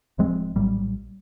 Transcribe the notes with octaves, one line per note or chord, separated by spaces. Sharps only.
D1 F3 G#3 C4
A#1 A2 F#3 G3